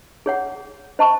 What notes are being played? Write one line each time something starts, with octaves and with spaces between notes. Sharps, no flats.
G#4 C#5 F#5
C5 D#5 A5 C#6